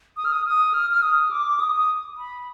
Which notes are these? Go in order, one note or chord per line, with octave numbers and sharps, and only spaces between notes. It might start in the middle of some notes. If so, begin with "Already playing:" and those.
D#6
F6
D#6
D#6
F6
F6
D#6
D6
D#6
B5